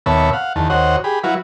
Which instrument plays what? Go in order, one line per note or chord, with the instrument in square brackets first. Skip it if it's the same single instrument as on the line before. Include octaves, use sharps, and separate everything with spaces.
[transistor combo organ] D#2 B2 C#5 E5 A5 B5
F5 F#5
E2 D#3 A5
D#2 F#4 C5 C#5 D#5 F#5
G4 G#4 B5
F#3 E4 F#4 B4 F5